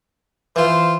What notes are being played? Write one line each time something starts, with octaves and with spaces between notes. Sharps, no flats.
E3 F4 C5